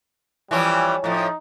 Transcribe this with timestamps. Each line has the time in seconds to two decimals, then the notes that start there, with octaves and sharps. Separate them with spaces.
0.51 E3 F3 G3 C#4
1.04 A2 F3 D#4